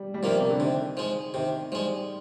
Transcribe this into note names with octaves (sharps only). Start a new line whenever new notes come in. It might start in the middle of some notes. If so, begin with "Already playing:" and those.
Already playing: G3
G3
C3 D#3 F3 A#3
C3
D3
C3 D#3
F3 G#3
C3 D#3
F3 G3 G#3